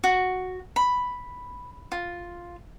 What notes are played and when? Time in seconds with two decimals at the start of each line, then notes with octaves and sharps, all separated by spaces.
0.04 F#4
0.76 B5
1.92 F4